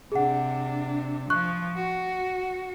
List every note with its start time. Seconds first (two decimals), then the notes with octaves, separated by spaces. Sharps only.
0.12 C3 D4 G#4 F#5
1.30 F3 C#6 F#6
1.75 F#4